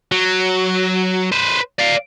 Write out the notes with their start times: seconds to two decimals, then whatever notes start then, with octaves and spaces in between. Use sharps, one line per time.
0.12 F#3
1.32 B4 C5
1.79 D5 F5